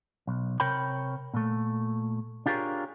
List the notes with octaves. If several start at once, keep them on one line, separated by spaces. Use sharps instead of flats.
B1
C3 A#4 C#5 G5 B5
A#2 A3
D4 F4 G4 G#4 A#4 C#5